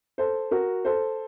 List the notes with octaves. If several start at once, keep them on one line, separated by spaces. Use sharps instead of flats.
A4 C5
F#4 A#4
A4 C5